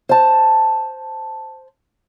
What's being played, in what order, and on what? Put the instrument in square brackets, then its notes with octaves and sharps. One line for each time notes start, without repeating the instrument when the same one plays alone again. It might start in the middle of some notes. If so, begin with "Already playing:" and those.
[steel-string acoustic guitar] C5 A5